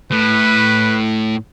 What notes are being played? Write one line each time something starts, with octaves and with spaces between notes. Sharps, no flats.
A2 B4